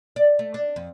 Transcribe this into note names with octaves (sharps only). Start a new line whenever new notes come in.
D5
A3
D4
F2